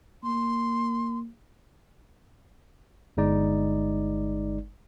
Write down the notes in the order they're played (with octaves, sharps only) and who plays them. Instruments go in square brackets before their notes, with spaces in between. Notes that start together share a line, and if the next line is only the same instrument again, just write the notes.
[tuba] A#3 [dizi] C6
[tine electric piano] G1 G#3 D#4 D5